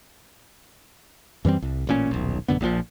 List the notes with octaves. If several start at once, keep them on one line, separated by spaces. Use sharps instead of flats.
F#2 E3 G3 C4
C2
A1 A#2 C#4
D#1 B1
A1 F#2 D3 B3
A#1 A#2 E3 F3